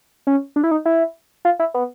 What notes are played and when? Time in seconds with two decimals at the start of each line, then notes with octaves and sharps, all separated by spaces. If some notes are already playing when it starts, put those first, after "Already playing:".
0.27 C#4
0.56 D4
0.64 E4
0.71 D#4
0.85 E4
1.45 F4
1.59 E4
1.74 B3